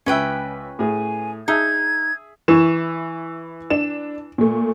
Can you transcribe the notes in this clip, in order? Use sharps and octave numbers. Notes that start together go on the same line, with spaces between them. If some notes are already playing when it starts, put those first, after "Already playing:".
C#2 C#4 B4 E5 G5
A2 G#4 G#5
D#4 G#4 E5 G#6
E3 E4 C#6 E7
D4 E7
A#2 A3